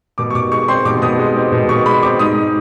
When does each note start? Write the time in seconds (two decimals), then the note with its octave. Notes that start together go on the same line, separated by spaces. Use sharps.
0.18 B2 D6
0.30 C#6
0.35 B2 D6
0.52 G#3 C#6
0.68 C4 C6
0.85 B2 D6
1.02 B2 D#6
1.19 G#3
1.36 C4
1.52 B2
1.69 B2 C#6
1.86 G#3 B5
2.03 C4 D6
2.19 G#2 D#6